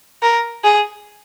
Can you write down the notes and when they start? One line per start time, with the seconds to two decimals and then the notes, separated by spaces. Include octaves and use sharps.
0.23 A#4
0.64 G#4